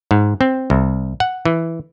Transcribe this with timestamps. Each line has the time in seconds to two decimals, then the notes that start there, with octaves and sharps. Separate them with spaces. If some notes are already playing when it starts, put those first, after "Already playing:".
0.11 G#2
0.41 C4
0.70 C2
1.20 F#5
1.45 E3